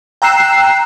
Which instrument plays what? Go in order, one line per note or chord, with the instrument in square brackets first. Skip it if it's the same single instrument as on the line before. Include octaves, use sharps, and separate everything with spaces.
[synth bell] G5 A#5 E6 F#6 C7 E7